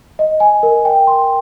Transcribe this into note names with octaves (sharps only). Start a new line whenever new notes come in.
D#5
G#5
A#4
G5
C6